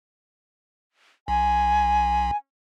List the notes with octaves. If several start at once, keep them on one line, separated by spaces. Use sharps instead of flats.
B1 G#5